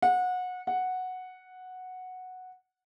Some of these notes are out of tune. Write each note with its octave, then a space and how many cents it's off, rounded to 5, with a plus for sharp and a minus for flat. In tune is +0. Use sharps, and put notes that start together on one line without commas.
F#5 -25
F#5 -5